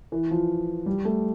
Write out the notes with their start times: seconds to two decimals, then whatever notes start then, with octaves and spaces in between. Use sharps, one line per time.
0.12 E3
0.31 F3
0.86 G3
1.05 A3